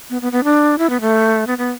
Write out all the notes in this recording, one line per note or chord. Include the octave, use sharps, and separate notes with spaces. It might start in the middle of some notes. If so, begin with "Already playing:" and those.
B3
B3
B3
D4
E4
B3
A3
B3
B3